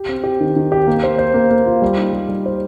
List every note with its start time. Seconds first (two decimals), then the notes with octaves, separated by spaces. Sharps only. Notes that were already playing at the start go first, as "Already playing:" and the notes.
Already playing: G4
0.09 C4
0.23 G4
0.40 D#3
0.56 D#3
0.72 G4
0.87 A#3
1.03 C5
1.18 C5
1.34 A#3
1.51 A#3
1.66 F4
1.82 G3
1.97 D#4
2.13 G3
2.29 G3
2.46 C5